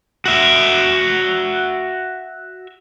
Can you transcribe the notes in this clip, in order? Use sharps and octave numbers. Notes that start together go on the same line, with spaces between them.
F#4 E5